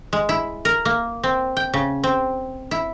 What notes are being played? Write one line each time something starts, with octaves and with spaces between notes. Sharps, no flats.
G#3
E4
A#4
A#3
C4
G5
C#3
C4
E4